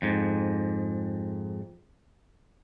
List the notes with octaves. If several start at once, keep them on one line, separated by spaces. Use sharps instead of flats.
F2 G#2